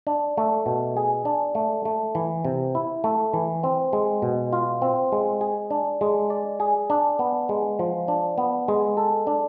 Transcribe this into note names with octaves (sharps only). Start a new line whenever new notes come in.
D4
A3
B2
G#4
D4
A3
A3
E3
C3
E4
A3
E3
C4
G#3
B2
F4
C4
G#3
G#4
D4
G#3
D5
G#4
D4
B3
G#3
F3
D4
B3
G#3
A4
D4